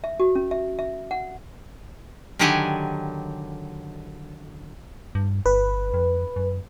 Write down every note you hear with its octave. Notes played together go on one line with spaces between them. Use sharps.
E5
F#4
C#4
E5
E5
F#5
D3 D#3 F#3 G4 F#5 G#5
G2
G1 B4
F2
F#2